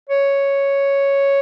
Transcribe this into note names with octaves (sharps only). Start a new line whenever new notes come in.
C#5